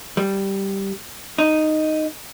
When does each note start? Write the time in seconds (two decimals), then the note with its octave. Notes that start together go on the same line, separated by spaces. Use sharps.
0.17 G3
1.38 D#4